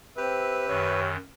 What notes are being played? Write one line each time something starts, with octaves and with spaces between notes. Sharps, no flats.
C4 G4 B4 E5
F#2 D#3 C#5